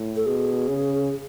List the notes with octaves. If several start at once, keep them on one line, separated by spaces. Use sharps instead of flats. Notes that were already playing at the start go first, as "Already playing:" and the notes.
Already playing: A2
A4
B2 G#4
C#3